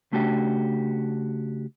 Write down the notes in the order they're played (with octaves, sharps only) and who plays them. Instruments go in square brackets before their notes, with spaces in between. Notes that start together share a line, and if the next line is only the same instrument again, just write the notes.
[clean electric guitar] C#3 A3 D4 F#4 G4